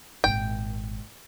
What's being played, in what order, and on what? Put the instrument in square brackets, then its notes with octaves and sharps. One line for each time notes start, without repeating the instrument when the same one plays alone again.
[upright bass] G#1 A#2 [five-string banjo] G5